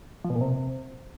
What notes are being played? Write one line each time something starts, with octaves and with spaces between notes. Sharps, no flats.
F3
B2
A#2
C3